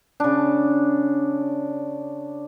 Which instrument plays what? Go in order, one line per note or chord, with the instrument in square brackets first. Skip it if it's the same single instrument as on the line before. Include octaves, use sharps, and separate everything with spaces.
[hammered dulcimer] C#3 D4